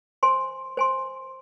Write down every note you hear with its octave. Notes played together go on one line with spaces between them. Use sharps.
C5 G#5 C6
C5 G#5 C6